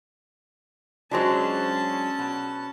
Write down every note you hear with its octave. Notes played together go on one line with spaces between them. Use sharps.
F#3 G#3 C#4 D4 F4 F#4 C5 A5
B2